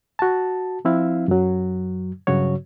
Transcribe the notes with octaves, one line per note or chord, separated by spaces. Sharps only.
F#4 A5
F3 C4 E4 F5
F#2 F#3
G2 C#3 F#3 F#4 C#5